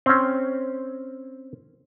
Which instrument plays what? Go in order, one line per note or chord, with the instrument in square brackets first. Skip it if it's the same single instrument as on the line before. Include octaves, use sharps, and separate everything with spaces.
[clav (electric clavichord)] C4 C#4